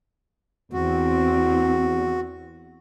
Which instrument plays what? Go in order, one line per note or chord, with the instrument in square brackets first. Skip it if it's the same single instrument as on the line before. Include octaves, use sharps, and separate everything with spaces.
[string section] E2 C4 [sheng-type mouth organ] F#4